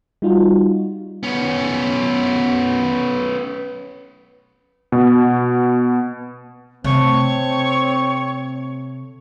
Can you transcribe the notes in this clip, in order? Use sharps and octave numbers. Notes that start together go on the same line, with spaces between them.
G3 D#4 F4 F#4
B3 C#4
B2
C3 A3 C4 C#5